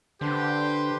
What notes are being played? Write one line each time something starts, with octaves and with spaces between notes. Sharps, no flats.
D3 D4 G4 B4 C5 C6